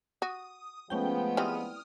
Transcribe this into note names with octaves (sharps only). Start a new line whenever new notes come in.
F#4 D#6
F3 G#3 A3 B3 C#4 G5
E3 G3 C4 D#6 F6